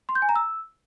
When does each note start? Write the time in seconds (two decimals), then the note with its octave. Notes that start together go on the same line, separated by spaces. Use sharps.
0.09 C6
0.15 G6
0.22 G#5
0.29 A#5
0.36 E6